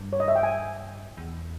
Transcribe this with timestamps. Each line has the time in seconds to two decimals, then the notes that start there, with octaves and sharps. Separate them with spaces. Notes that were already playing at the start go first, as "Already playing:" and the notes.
Already playing: G2
0.13 C#5
0.20 D#5
0.28 E5
0.36 G5
0.43 G#5
1.17 E2